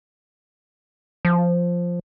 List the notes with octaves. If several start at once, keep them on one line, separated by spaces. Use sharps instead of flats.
F3